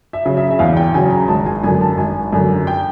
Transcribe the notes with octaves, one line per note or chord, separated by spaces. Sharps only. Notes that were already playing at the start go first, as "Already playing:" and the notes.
E5
C#3 F#3
E5
E5
E2 F5
G5
C#3 F#3 G#5
A#5
G#1 A5
G#5
F#2 D3 G#5
A5
G#1 G#5
F#2 D3
G5